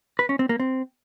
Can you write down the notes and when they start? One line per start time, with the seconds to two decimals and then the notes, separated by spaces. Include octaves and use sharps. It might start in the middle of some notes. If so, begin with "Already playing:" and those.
0.19 B4
0.29 C#4
0.39 C4
0.49 A#3
0.60 C4